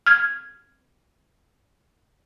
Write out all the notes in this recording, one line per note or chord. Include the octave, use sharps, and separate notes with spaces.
F6 G#6